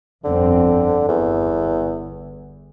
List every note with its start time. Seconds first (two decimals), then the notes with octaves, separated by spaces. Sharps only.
0.25 G1 F2 D3 C4
1.09 G1 E2